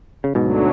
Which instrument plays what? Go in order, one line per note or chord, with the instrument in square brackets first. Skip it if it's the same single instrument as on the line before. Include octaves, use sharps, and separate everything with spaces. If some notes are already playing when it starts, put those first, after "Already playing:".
[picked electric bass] C#3
[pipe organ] D2 D3 F#3 [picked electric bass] G#2 B2